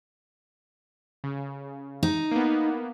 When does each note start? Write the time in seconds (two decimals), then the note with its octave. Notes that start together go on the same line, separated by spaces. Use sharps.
1.24 C#3
2.03 D#4
2.32 A#3 B3